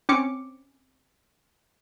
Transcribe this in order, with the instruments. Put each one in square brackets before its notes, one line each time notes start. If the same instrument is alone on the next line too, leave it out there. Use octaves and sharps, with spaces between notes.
[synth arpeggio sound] C4 C#4 D6 C#7